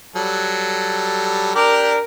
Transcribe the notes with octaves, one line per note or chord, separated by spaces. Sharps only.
F#3 G3 A4
D4 G4 A#4 D5